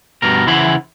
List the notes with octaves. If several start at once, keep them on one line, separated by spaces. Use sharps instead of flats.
G2 B2 A#4
C#3 E3 E4 C5 E5 F#5